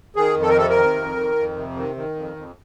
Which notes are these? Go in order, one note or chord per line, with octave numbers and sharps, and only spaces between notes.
D#3 G#4
F2
A4
A#4
C3 A4
A#4
D#3
F2
D#3
F2
C3
D#3
D#3
F2
F2